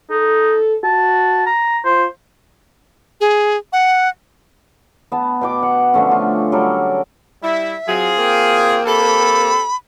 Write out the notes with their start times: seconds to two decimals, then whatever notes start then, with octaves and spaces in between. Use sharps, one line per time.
0.10 D#4 A4
0.84 F#4 A5
1.46 A#5
1.85 F4 C5
3.21 G#4
3.73 F#5
5.12 B3 A5
5.41 B2 G5 D6
5.63 F#5
5.94 D3 F3 A3 C#4
6.11 A3 F4
6.52 F#3 G3 A4 A#4
7.43 G3 E4 E5
7.87 F#3 C4 F4 G#4
8.18 A#3 G5
8.86 C4 G4 A4 B5